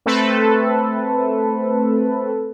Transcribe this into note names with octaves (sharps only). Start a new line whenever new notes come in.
A3 C4 A4 B4